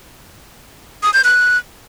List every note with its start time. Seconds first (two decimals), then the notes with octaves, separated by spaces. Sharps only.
1.03 D#6
1.14 G6
1.24 F#6